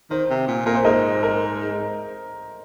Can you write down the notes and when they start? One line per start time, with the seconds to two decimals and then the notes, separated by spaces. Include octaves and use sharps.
0.10 D#3 C5
0.30 C3
0.48 A#2
0.66 A#2 A#4
0.75 C5
0.85 G#2 A#4 D#5
1.23 A#4